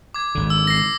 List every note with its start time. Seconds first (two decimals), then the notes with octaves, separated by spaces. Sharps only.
0.14 D6 G#6
0.35 G#1 D3
0.50 E6
0.67 A#6 C7